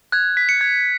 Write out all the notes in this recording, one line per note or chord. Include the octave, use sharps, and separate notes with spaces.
F#6 G#6
B6
C#7
G#6